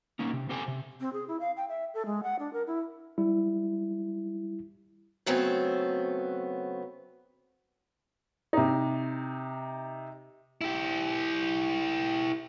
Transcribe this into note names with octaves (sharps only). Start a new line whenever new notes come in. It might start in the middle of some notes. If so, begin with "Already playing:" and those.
A#3 C#4 D#4
C3
C4 G4 A4 C5 G5 G#5
C3
C4
G#4
E4
F5
G5
E5
A4
G#3
F#5
D4
A#4
E4
G3 E4
C#3 F#3 A3 B3 C4
C3 D#4
E4 G4